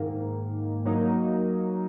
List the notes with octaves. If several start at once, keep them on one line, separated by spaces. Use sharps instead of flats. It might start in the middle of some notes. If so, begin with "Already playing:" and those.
Already playing: G#2 D#3 A#3
F#3 A#3 D#4